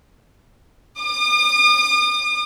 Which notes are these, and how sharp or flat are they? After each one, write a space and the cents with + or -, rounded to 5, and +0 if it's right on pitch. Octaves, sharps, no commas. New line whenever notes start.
D#6 -45